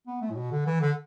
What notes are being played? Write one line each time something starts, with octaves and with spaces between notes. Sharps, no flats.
B3
A3
A2
B2
D3
E3
D3